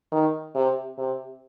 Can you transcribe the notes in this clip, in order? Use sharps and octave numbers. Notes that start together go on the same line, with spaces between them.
D#3
C3
C3